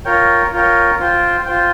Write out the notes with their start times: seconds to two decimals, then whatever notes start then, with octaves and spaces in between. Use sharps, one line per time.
0.05 F4 A#4 C#5 G5
0.53 F4 A#4 C#5 G5
0.99 F4 C5 G5
1.46 F4 C5 G5